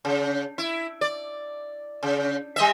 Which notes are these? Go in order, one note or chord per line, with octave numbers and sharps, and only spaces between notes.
C#3
E4
D5
C#3
G3 D#5 E5